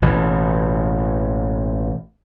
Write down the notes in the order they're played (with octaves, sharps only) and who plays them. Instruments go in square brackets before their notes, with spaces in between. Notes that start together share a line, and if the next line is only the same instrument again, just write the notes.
[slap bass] A1 B2 E3